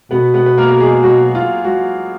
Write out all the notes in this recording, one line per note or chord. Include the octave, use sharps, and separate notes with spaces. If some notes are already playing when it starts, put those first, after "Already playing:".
B2 B3 B4
B3 B4
B4
A#3 A#4
A#4
G#3 G#4
F#3 F#4
F4
F#3 F#4